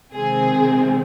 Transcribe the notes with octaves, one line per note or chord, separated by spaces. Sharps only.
C3 D#3 G#3 C4 G#4